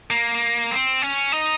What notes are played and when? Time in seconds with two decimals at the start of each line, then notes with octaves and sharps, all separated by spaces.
0.10 A#3
0.71 C4
1.02 C#4
1.32 D#4